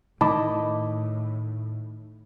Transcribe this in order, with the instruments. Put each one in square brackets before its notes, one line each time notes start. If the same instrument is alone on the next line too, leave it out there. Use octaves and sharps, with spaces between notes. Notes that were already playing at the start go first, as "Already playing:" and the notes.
[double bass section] A2 [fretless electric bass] D#3 [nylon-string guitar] E4 D#5 [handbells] A5 B5 D6